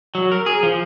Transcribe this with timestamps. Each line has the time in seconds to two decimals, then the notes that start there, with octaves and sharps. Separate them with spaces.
0.15 F#3
0.32 A#4
0.46 G#4
0.63 F3